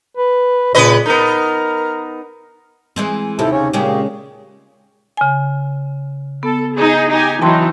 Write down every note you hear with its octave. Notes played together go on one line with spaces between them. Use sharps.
B4
A#2 C#3 B4 D#5
B3 D#4 A#4
E3 G#3 C4
D#2 C3 E4 A4
C#3 C#4 C#5
A#2 C#3 G#3 C#4 G4
C#3 G#5
B3 A4
D#4 G#4
D#4 G4 G#5
E3 F#3 D#4 G5 A5 C6